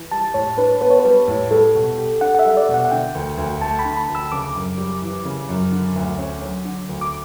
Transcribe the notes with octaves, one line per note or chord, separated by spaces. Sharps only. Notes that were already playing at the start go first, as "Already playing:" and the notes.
Already playing: E3
G3 A5
A2 C#5
D4 B4
B3 B4
C#5
B4
G3
A2
G3 A4
B2
G4
D4 F#5
F#5
E5
G3
D5
B2
F#5
F#5
D3 G5
D2
D2
A3 A5
B5
D3
B5
D2
E6
C#3 D6
F#2
G3
E3
C#3
F#2
D3
D2
C#4
F#3
D3
D2
D6